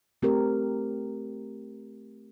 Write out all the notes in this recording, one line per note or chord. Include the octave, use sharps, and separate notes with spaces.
A3 C4 G4 A#4